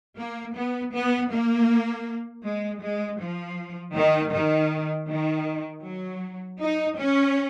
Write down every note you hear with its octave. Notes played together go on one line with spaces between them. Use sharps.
A#3
B3
B3
A#3
G#3
G#3
F3
D#3
D#3
D#3
F#3
D#4
C#4